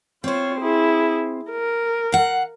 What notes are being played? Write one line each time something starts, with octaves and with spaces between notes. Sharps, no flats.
C4 F4 C5 C#5
E4 G#4
A#4
F5 F#5